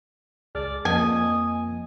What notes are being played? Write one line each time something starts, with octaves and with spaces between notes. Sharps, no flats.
C#2 G#4 D5 F6
F2 F3 A#3 D#5 G#5